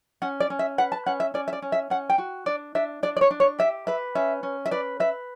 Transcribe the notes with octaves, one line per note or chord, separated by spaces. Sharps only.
C#4 F#5
D5
C#4
E5
B4 F#5
A5
C#4 F#5
E5
C#4 D5
E5
D5
C#4
E5
C#4 F#5
G5
F#4
D4 D5
D4 E5
D4 D5
D5
C#5
D4
C#5
G4 E5
B4 E5
C#4 E5
C#4
E5
B4 D5
B4 E5